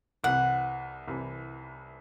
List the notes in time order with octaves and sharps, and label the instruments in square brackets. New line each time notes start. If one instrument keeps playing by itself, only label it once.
[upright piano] C2 C3 E3 [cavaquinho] F#5
[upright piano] C2 C3 E3